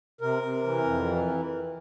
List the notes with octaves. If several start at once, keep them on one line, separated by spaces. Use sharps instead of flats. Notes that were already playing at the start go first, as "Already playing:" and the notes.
C3 A#4
C3
E3
F2
E3